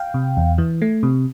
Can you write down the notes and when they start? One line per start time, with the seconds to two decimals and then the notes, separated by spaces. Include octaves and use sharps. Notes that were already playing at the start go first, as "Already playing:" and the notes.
Already playing: F5 G5
0.14 C3
0.37 E2
0.58 E3
0.82 A3
1.03 C3